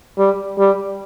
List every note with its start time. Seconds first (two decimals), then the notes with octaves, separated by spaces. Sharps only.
0.18 G3
0.58 G3